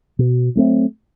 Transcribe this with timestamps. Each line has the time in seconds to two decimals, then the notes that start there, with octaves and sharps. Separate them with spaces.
0.19 B2
0.55 F#3 A3 C4